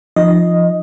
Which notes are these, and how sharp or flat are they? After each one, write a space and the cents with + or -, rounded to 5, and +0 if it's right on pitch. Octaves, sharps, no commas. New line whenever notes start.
F3 -10 D#4 -30 D#5 +0